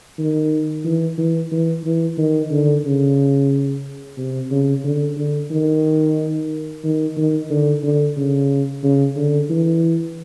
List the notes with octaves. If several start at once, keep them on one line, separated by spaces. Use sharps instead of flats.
D#3
E3
E3
E3
E3
D#3
D3
C#3
C3
C#3
D3
D3
D#3
D#3
D#3
D3
D3
C#3
C#3
D3
E3